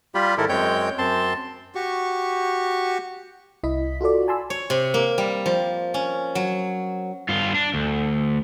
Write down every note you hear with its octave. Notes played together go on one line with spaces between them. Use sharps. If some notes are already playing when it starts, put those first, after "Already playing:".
G3 F4 G4 B5
G#2 D#3 E4 A4 A#4
F#2 G#3 C4 C#5 G5 G6
F#2 C4 A5 C6
F#4 G4 C#6
C2 E4 D#5 B6
F4 F#4 A4 D5
G#5 A5 B5 C6 E6
C#5
C3
A#3
G3
F3
C#4
F#3
G2 F4
D4
D2